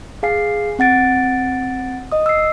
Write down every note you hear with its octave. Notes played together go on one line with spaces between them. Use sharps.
G#4 F5 G#5 C7
C4 F#5 A6 D7
D#5 D#6
E6 C7